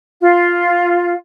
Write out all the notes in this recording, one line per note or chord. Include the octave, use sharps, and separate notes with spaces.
F4